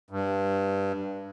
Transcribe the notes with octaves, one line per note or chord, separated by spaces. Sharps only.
G2